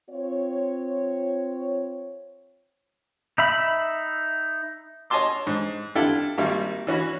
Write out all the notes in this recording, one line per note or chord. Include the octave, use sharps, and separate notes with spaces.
C4 F4 C#5
D#4 E5 B5
C#5 D#5 G#5 A5 C6 D6
G#2
D4 E4 F4 A4 D5 G5
G#1 G3 A#3 E5
E3 C#4 F#4 B5